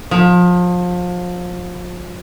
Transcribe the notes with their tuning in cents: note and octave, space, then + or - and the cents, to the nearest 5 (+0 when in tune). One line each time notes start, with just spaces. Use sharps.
F3 +30